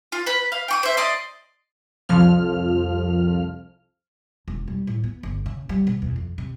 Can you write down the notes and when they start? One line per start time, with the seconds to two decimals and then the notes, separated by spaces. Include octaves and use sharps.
0.12 F4
0.26 B4 B5
0.52 F5
0.68 G5 C#6 D#6
0.83 C5 E5
0.97 D5 D#5 C6
2.09 C2 F2 F3 F6
4.48 E1
4.68 G3
4.87 A2
5.04 B3
5.23 G1
5.46 C#3
5.69 G3
5.87 B2
6.02 E2
6.16 F2
6.38 C3